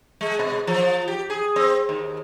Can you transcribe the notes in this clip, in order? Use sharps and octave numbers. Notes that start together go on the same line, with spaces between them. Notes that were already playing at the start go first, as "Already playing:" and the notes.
G#3
B2
F3
G4
G#4
C4
D#2